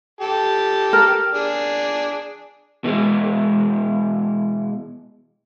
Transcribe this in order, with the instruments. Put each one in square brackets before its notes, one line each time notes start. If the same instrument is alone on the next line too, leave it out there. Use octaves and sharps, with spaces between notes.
[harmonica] G4 A4
[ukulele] A#4
[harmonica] D4 G#4
[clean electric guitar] B2 E3 G#3